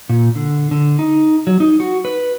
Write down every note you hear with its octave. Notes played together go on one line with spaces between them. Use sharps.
A#2
D3
D3
D#4
F#3
D#4
F#4
B4